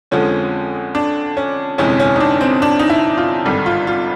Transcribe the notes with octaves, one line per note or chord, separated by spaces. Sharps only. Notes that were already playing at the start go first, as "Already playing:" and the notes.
F2 D3 F3 G#3 C#4
D4
C#4
G1 F2 C3 E3 G#3 C#4
C#4
D#4
D4
C4
D4
D#4
E4
F4
G#1 G2 D3 G3
F4
F4